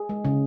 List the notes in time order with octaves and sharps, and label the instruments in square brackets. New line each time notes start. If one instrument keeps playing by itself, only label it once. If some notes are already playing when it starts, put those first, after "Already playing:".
Already playing: [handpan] G#4
G#3
C#3